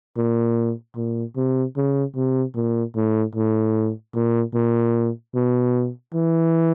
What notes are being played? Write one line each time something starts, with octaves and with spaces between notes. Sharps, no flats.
A#2
A#2
C3
C#3
C3
A#2
A2
A2
A#2
A#2
B2
E3